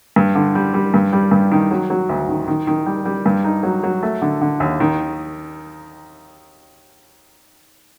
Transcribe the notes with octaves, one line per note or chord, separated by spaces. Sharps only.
G2
D3
G3
G3
G2
G3
G2
D#3
F#3
F#3
D2
D#3
D#3
D#3
G3
G3
G2
D#4
F#3
F#3
A3
D3
D3
D#2
D#3